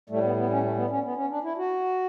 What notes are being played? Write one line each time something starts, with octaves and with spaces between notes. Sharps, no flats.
A2 G3 A3
B3
B3
C#4
A3
B3
C#4
B3
C#4
D4
E4
F#4